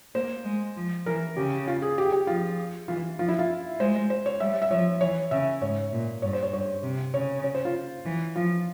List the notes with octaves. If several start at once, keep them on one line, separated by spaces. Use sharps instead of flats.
A#3 C5
G#3
F3
E3 A#4
C#3 G4
F4
G#4
G4
G#4
G4
F3 F4
E3 F4
F3 F4
E4
F4
G#3 C5
C5
C#5
G3 E5
E5
F3 C#5
E3 C#5
C#3 E5
G#2 C#5
A#2
G2 C#5
C5
C#5
G2 C#5
C3
C#3 C#5
C#5
C5
F4
E3
F3 F4